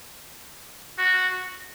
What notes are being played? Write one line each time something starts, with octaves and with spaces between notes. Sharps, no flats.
F#4